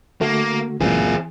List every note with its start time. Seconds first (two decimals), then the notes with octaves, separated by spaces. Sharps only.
0.21 D3 A3 A#3 F#4
0.81 C#2 F#2 A#2 E3 C4 G#4